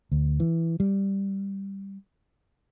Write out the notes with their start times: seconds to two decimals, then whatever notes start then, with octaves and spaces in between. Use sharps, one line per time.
0.12 D2
0.40 E3
0.80 G3